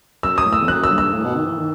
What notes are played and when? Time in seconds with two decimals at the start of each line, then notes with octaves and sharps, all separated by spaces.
0.23 F#2 E6
0.38 D#6
0.46 A2
0.53 E6
0.61 E2
0.68 F#2 F#6
0.84 E6
0.91 G2
0.98 E6
1.13 A2
1.24 B2
1.35 D#3
1.46 E3
1.58 D#3